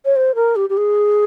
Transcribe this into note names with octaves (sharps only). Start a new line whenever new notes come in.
C#5
C5
A#4
G4
G4
G#4